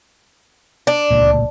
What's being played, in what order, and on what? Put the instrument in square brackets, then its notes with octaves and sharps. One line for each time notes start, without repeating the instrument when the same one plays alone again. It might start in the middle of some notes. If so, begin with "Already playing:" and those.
[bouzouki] D4
[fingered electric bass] D1 C#2 A#2